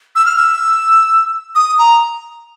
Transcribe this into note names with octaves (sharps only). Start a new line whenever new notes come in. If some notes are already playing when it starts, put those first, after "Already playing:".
E6
F6
E6
D#6
A#5